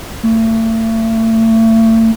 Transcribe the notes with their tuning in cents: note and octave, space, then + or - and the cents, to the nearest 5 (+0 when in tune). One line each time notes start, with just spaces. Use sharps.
A3 +35